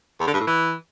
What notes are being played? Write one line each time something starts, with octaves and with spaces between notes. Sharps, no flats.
E2
D3
G2
A2
E3